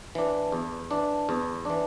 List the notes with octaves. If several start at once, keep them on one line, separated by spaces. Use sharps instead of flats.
E3 D4
E2
E3 D4
E2
E3 D4